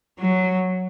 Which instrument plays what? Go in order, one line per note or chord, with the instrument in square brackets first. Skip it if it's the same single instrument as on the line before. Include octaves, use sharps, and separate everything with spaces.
[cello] F#3